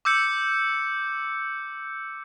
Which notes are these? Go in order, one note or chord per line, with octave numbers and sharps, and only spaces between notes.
D6 E6 G6 C#7